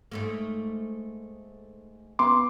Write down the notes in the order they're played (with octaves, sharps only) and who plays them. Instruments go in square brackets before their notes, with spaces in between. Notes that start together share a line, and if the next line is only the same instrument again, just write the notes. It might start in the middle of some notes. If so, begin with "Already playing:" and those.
[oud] G#2 A3 A#3
[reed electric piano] B3 D6 [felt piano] C6